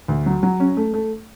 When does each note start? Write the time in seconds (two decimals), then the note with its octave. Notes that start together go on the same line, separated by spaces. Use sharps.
0.08 D2
0.26 F#3
0.43 F#3
0.60 C#4
0.77 A3
0.94 A3